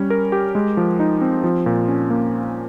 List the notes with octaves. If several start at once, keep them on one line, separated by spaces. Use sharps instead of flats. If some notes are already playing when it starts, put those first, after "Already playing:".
Already playing: G3 C#4
A#4
G4
G#3
F3
D#4
C4
F3
A#2
C#4
A#3